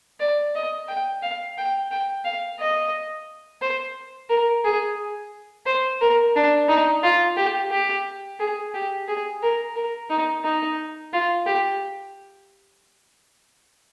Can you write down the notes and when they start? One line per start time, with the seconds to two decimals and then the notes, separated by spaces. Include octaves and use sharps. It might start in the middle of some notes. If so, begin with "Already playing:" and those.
0.20 D5
0.55 D#5
0.88 G5
1.22 F5
1.58 G5
1.91 G5
2.25 F5
2.59 D#5
3.62 C5
4.30 A#4
4.64 G#4
5.66 C5
6.01 A#4
6.35 D4
6.68 D#4
7.03 F4
7.37 G4
7.71 G4
8.40 G#4
8.74 G4
9.08 G#4
9.43 A#4
9.76 A#4
10.10 D#4
10.44 D#4
11.13 F4
11.47 G4